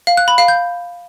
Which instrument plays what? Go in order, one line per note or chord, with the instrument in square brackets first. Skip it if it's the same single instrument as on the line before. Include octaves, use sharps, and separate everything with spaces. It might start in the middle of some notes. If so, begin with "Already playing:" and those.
[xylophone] F5
F#6
B5
F5
G6